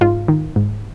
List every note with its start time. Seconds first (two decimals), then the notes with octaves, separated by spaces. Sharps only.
0.01 G#2 F4
0.28 D#3
0.56 G#2